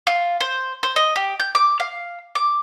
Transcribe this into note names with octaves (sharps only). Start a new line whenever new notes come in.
F4
C5
C5
D#5
G4
G6
D6
F5
D6